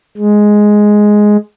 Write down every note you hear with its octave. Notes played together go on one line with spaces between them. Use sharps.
G#3